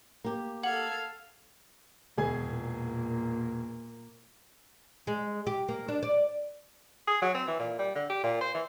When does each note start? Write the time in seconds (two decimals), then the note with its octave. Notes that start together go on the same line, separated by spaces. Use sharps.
0.24 A#3 G4
0.63 A4 F5 F#5 G#6 F#7
2.18 E1 E2 G#4 G#5
2.48 A#2 A#3
5.07 G#3
5.47 G4
5.68 A#3
5.88 D4
6.03 D5
7.07 G#4
7.22 F#3
7.35 C4
7.48 E3
7.60 A#2
7.79 G3
7.95 D3
8.10 G4
8.24 A#2
8.41 C5
8.55 E3